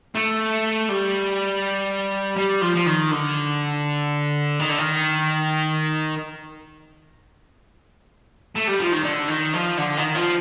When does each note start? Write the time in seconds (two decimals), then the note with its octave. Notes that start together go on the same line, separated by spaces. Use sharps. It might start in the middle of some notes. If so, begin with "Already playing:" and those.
0.15 A3
0.89 G3
2.37 G3
2.62 F3
2.75 F3
2.87 D#3
3.12 D3
4.59 D#3
4.69 D3
4.78 D#3
8.55 A3
8.67 G3
8.80 F3
8.92 D#3
9.04 D3
9.28 D#3
9.53 F3
9.78 D3
9.97 D#3
10.15 F3